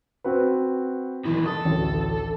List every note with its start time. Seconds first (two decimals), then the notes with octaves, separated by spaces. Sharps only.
0.24 C4 F#4 B4
1.25 B2 D#3 E3
1.46 A4 D#6
1.65 A1 D2